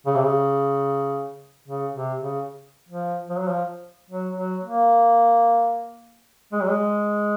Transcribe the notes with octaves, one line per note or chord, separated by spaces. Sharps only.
C#3
C3
C#3
C#3
C3
C#3
F3
F3
F#3
F3
F#3
F#3
A#3
G#3
F#3
G#3